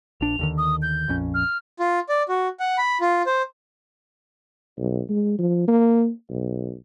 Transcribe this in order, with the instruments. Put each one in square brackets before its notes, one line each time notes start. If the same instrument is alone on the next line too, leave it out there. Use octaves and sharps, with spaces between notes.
[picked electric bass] A#1 D4 [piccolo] F7
[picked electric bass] D#2 D3 D#3
[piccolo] D#6
G6
[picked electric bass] A#1 F2 C#4
[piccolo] F6
[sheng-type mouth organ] F4
D5
F#4
F#5
B5
F4
C5
[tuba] B1
G#3
F3
A#3
B1